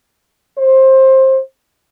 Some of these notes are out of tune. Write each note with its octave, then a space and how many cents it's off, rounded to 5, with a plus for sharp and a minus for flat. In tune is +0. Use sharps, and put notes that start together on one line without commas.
C5 +20